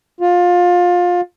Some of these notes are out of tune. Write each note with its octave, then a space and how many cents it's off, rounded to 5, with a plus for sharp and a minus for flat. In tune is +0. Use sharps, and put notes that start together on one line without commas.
F4 +20